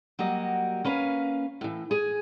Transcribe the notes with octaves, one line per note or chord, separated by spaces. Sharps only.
F#3 G3 A#3 F#4 D#5
A#3 C#4 B4 F5
A2 E3
G#4 G#5